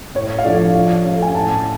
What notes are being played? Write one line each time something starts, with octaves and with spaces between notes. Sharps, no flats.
A2 C#5
F5
F3 A3 D4 D5
F3 F5
A3 C#4
G#5
A2 A5